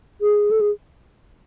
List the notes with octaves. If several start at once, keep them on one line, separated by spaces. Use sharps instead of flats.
G#4
A4
G#4